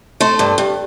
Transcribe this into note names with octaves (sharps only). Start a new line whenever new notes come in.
A3 C5
G2
G2